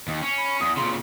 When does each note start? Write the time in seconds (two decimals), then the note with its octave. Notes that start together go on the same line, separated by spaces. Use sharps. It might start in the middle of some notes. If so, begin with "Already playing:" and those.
0.08 D#2
0.22 C#4
0.38 B5
0.60 E2 D#6
0.77 A#2 C#3 C6